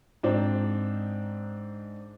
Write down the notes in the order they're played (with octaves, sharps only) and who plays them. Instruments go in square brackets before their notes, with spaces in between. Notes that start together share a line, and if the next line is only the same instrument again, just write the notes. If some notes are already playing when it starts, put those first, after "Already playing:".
[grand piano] G#2 C4 D4 D#4